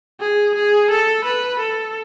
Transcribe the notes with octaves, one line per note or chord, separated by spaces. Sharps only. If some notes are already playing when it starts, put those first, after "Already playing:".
G#4
G#4
A4
B4
A4